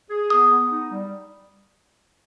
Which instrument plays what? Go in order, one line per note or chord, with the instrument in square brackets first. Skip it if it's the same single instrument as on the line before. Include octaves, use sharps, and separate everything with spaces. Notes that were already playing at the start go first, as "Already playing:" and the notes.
[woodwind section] G#4
[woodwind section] B3 [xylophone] D#6
[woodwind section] B3
D#4
G3